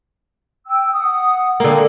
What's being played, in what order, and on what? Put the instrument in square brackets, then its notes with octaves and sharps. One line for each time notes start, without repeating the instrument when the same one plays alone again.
[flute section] G5 E6
F#5 D#6
[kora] D3 A#3 [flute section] A4 F5 G5